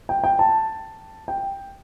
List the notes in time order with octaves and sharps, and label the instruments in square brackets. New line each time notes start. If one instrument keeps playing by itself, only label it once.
[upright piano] G5
G5
A5
G5